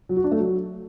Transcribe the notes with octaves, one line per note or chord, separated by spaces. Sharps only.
F#3
F#4
D4
A3
F#3